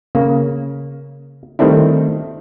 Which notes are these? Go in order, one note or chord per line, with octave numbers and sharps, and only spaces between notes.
C#3 A#3
D#3 G3 A3 C4 D4 E4